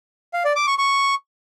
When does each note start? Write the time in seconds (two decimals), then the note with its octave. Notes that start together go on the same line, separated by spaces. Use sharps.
0.34 F5
0.45 D5
0.56 D6
0.67 C#6
0.78 C#6